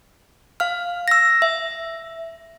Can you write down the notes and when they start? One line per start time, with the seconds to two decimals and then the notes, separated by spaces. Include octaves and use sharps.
0.60 F5 F6
1.08 E6 A#6
1.42 E5